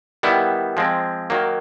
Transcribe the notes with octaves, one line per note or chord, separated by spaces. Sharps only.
D#3 G3 B3 E4
F3 G#3 C4
D#3 F#3 A#3